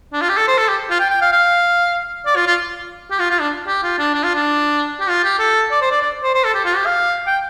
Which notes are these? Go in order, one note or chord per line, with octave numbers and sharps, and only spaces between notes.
D4
F4
G4
A4
C5
A4
G4
F4
G5
G5
F5
F5
D5
F4
F4
G4
F4
F4
D4
G4
F4
D4
D4
F4
D4
G4
F4
G4
A4
D5
C5
D5
D5
C5
C5
A4
G4
F4
G4
F5
G5